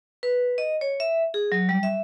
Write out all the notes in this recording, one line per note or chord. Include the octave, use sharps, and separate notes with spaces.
B4
D#5
C#5
E5
G#4
F#3
G3
E5